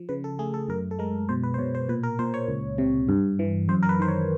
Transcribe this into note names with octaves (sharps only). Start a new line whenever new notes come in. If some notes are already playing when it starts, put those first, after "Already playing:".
Already playing: F3
C#3 B4
A4
A3 G#4
A4
F#2 A#4
A4
G#3 A#4
B2 C5
B4
C5
B2 C#5
C5
A#2 B4
A#4
A#2 C5
C#5
C#2
C3
G2
E3
F#2 C5
A#4
B4
D#3 C5
C#5